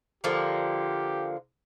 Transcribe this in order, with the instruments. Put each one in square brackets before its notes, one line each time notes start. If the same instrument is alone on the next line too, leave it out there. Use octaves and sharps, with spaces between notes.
[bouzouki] D3 F3 A#3 [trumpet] G4